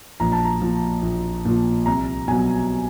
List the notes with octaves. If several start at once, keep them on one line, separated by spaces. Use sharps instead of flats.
A#1 A#5
A5
A#5
A#2 F3
A#1
A#2 F3
C2 A#5
B2 F#3 G#5